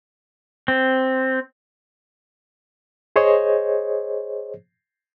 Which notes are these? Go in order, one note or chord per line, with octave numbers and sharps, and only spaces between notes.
C4
G#4 C5 C#5 D#5